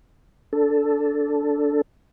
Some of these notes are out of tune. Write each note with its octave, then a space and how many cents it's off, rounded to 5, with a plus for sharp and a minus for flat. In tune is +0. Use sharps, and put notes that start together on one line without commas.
D4 -15 A4 +0